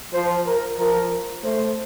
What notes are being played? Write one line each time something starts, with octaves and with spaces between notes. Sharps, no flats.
F3 C5
A#4
F3 A#4
A3 C5